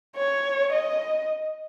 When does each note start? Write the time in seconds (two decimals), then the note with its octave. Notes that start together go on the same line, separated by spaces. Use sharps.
0.16 C#5
0.73 D#5